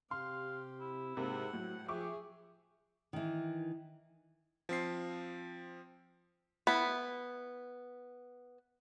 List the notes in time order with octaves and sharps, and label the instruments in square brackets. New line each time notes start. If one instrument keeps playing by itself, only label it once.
[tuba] C3 [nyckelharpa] G4 [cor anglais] F5 [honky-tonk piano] C6
[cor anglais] E4
[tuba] G#2 [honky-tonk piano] C3 A#3 [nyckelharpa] F#5
[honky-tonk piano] A2 [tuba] F#3
[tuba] F3 [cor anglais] G4 [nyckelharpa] G#4 [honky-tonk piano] E5 C#6 D6
[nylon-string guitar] D#3 E3
[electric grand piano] F3 C4 C7
[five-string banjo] B3 E4